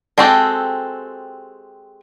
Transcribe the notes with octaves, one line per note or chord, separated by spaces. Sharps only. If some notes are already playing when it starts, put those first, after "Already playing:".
G#3 C4 F#4 G4 A4